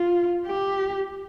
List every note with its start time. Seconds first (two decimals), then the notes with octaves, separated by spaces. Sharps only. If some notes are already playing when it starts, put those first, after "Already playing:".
Already playing: F4
0.46 G4